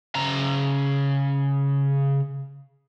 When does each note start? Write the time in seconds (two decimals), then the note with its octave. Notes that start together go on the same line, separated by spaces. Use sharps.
0.15 C#3 A#5